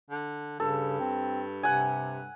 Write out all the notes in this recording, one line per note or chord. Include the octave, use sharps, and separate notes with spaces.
D3
G2 C#3 A4
C4
C3 F#5 G#5